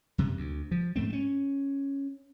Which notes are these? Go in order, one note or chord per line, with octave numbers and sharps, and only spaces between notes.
F#2 C3
D2
F3
G#2 A3 C4
C4 C#4